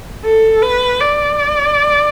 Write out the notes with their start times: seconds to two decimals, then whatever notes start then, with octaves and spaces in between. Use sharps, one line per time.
0.25 A4
0.62 B4
1.00 D5